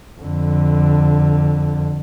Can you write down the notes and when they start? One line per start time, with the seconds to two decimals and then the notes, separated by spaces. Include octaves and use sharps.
0.22 F2 D3